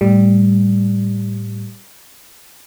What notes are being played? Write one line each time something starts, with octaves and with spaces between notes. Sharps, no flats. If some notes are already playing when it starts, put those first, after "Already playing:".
A2 G3